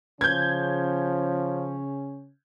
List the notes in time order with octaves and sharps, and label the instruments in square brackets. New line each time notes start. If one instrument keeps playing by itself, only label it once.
[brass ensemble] C#3 C#4 [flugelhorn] F3 [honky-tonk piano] G6 G#6